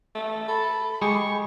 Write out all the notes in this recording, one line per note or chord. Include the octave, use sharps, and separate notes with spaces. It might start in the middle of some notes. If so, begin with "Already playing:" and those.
A3
A4 B5
G#3 G4 G#4 C#6